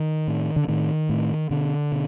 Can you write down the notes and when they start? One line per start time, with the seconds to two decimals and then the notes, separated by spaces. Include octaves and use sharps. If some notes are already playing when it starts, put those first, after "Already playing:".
Already playing: D#3
0.28 A2
0.56 D3
0.68 A2 D#3
1.09 A2
1.51 B2 D3
1.92 B2